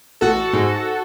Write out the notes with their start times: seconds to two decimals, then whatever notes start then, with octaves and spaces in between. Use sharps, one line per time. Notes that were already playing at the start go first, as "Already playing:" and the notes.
0.21 A1 F#4 A4
0.53 G#2